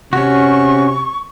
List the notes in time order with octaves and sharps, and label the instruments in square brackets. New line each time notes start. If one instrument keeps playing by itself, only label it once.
[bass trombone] C3 [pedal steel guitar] C#4 F#4 [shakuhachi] C#6